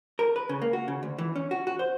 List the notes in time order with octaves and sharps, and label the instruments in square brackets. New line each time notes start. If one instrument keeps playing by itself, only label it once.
[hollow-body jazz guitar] A#4
B4
C#3
A#3
F#4
C#3
D2
E3
C#4
F#4
F#4
C5